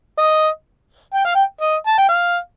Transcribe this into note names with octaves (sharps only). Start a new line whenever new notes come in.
D#5
G5
F5
G5
D#5
A5
G5
F5